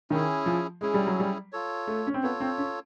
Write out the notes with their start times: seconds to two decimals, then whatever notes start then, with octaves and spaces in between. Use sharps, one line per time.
0.10 D#3 C#4 E4 G#4
0.46 F3
0.81 G#3 C#4 E4 G#4
0.94 G3
1.07 F#3
1.20 G3
1.52 F4 A4 C#5
1.87 A3
2.07 C#4
2.14 C4
2.22 B3 F4 A4 C#5
2.40 C4
2.58 C#4